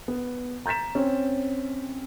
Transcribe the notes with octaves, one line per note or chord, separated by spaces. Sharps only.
B3
A#5 G6 A6 B6 E7
C4 C#4